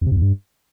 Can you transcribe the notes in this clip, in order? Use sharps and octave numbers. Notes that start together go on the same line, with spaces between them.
F2
C3
F#2
E2
G2